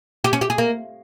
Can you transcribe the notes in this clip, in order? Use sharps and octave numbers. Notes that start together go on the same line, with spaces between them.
G4
C#4
G4
G#4
A#3